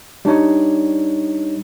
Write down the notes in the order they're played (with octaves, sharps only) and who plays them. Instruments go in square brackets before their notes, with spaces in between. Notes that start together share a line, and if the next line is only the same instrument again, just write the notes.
[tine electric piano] G3 D4 D#4 C#5